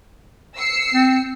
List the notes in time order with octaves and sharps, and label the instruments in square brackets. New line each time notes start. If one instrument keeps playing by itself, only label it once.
[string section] E6 C7 C#7
[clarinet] C4